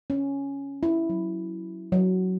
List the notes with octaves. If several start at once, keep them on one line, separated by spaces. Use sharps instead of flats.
C#4
E4
F#3
F#3